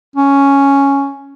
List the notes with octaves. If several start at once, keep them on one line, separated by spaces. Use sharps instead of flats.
C#4